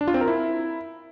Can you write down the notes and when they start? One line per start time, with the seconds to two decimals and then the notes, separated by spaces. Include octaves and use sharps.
0.01 D4
0.07 F4
0.14 C4
0.21 A#4
0.28 E4